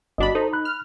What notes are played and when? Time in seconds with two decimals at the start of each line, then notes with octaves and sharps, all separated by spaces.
0.18 G1 D4 F#4 D#5 B5
0.35 D#4 A4 C5
0.53 B5 F#6
0.65 F6